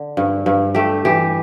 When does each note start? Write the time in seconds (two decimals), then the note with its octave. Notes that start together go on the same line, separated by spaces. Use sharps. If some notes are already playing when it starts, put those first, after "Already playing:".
Already playing: D3
0.17 G2
0.46 G2
0.75 A3 G4
1.05 E3 G4